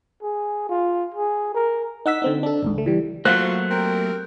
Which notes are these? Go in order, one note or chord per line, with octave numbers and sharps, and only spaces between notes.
G#4
F4
G#4
A#4
D#4 F#5 E6 B6
D3 C4 D#4
D4 A4
A1 D#2 G#2
C#2 A3
E3 G3
F#3 A3 A#3 F4 F#4 C5 F#6
C4 G4 A#4